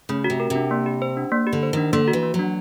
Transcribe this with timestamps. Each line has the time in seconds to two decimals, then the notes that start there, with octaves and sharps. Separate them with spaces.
0.09 C#3 A3
0.24 F#4
0.30 C3
0.40 A#4
0.50 C3
0.56 D4
0.71 A#3
0.86 G4
1.02 C5
1.17 D4
1.32 A#3
1.47 G4
1.53 D3
1.63 C5
1.73 D#3 D4
1.93 D3 A#3
2.08 F#4
2.13 E3
2.23 A#3
2.34 F#3
2.39 D4